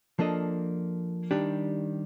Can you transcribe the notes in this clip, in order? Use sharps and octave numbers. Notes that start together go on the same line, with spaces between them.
F3 A#3 D4 A4 D#5
D#3 G3 D4 G4